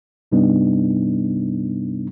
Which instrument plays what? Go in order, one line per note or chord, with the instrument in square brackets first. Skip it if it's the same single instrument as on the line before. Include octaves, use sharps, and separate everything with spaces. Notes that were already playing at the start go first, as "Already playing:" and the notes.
[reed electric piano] G2 C3 G3 B3 D4 D#4